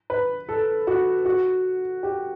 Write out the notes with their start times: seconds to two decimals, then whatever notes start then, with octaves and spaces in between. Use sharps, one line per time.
0.10 B4
0.49 A4
0.87 F#4
1.25 F#4
2.03 G4